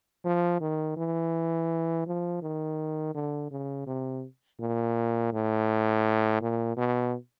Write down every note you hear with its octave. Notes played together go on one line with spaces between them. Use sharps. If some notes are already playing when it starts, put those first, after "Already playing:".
F3
D#3
E3
F3
D#3
D3
C#3
C3
A#2
A2
A#2
B2